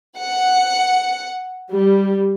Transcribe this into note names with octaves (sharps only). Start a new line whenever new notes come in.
F#5
G3